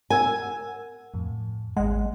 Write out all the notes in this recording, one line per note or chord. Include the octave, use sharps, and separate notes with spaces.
A#4 F#5 G#5 E6
F2 A2
G#1 G#3 F#5